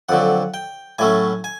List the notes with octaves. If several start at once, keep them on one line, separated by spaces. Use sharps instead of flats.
F2 D3 F#3 F#5
G5
A2 F#3 A3 C#4 G#5
G#5